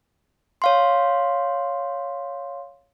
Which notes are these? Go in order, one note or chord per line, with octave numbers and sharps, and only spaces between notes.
C#5 F5 C6